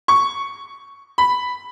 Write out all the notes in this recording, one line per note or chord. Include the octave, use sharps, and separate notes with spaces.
C#6
B5